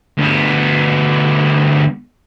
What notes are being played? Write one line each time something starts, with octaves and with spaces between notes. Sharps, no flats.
D2 B3